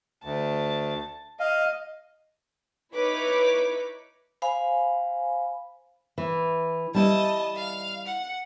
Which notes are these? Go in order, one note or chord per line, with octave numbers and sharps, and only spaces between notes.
D2 A5
D#5 F5
D#4 E4 B4 C#5 D6
C5 F5 G#5 B5
E3
G3 E4 D#5 A5
F5
F#5